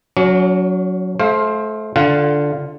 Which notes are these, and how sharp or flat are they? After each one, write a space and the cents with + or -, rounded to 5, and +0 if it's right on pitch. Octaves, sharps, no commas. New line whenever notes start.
F#3 -5 C#4 +40
A3 -30 C5 +15 F5 +0
D3 -5 F4 +0 F#5 +20